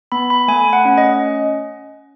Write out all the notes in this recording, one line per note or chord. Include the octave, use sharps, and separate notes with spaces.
B3 B5
B5
A3 G#5
F#5
C#4
D#5